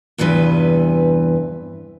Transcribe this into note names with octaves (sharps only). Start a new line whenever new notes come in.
E2 G2 C3 E3 B4